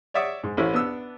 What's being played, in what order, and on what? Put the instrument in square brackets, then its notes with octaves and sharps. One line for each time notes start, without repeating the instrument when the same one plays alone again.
[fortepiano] C#5 D5 E5 F#5 D#6
G#2
A1 A3 C#4 E4 C5
B3 D4 E6